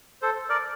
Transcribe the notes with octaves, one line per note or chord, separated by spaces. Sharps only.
A4 C5
A#4 D5